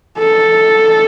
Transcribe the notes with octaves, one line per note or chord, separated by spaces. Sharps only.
A4